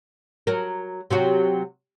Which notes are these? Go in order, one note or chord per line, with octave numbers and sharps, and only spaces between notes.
F#3 A#4
C3 F#3 F#4